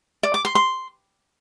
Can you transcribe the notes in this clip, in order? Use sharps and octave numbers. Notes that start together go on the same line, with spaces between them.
D5
D6
C6
C6